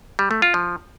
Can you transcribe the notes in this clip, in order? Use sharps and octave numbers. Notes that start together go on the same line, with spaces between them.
G3
A3
F4
F3